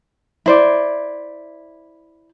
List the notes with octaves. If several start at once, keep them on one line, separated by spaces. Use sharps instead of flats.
E4 C5 D5